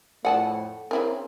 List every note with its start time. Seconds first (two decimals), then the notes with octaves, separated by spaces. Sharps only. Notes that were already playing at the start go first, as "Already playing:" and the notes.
0.25 F2 A2 A3 D5 F#5 G#5 A5
0.91 C#3 A#3 C4 C#4 E4 A#4